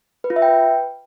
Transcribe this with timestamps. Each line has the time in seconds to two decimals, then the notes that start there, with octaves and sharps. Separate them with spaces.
0.24 B4
0.30 F4
0.36 E5
0.42 G5
0.48 B4